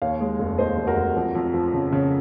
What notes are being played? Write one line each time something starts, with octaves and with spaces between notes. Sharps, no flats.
D#2 C#5 F5
G#3
F1
D#2 C5 D#5
F1
F#4 A#4
F1
F2
F2
F3
C#3
C#3